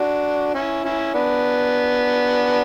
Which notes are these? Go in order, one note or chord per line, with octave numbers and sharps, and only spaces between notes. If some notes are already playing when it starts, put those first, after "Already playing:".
Already playing: D4 F#4
C#4 E4
C#4 E4
B3 D4